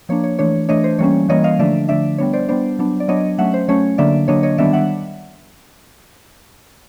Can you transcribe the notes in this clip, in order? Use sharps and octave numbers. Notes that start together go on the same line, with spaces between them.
F3 A#3 D4 C#5
C#5
E3 A3 D4 C#5
E3 A3 D4 C#5 D#5
C5
E3 G3 A#3 C#4 C#5
E3 G3 A#3 C#4 C#5 D#5
D#5 F5
D3 F3 A3 D4 D5 E5
D3 F3 A3 D4 D5 E5
G3 B3 D4 C#5
C5 D5
G3 B3 D4 C5 D5
F#3 B3 D4
D5
F#3 B3 D4 C#5 D#5
F#3 A3 C#4 E5 F#5
C5
F#3 A3 C#4 C#5
D3 F#3 A#3 D4 D5 E5
D3 F#3 A#3 D4 C#5 D#5
C#5 D#5
D#3 G3 B3 D4 D5 E5
E5 F#5